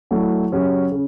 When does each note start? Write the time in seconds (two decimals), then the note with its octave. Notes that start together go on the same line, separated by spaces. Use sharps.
0.11 F#3 A3 E4
0.52 C#3 F#3 C#4 G4
0.92 C#3